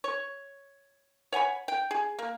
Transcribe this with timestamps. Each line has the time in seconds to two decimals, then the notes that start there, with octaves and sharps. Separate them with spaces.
0.04 C#5
1.32 C#5 F#5 G#5 B5
1.68 G5
1.91 G#4
2.19 A#3